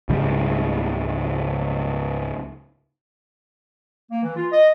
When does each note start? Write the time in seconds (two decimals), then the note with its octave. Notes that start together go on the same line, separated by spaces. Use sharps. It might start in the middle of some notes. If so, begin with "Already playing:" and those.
0.09 C#2 G#2 C#3 G3
4.11 A#3
4.23 E3
4.36 F4
4.51 D#5